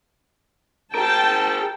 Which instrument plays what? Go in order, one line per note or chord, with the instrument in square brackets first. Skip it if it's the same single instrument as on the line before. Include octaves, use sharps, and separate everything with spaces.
[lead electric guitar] G#4 A#4 [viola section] G5 A5